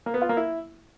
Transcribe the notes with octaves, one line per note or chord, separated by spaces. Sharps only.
A#3
B3
F4
A#3
E4